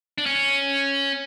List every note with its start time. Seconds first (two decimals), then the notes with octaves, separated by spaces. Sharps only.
0.18 D4
0.26 C#4